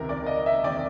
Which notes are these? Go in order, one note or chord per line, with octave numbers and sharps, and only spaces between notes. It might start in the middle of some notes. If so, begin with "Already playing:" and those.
Already playing: C#2 C3 D#3 A#4
D5
D#5
E5
C3 D#3 D5